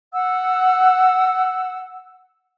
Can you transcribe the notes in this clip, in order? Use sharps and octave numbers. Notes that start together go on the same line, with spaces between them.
F#5 E6